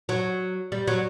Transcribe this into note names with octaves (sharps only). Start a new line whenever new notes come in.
F#3
G3
F#3